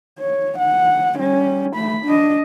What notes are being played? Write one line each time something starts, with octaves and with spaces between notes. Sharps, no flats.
C#5
F#5
G3 C#4
A3 B5
D4 D#5